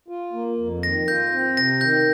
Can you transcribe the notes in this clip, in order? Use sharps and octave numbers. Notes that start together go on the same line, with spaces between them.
F4
A#3
F2
D#3 A#6
F4 G6
C4
C3 A#6
D#3 G6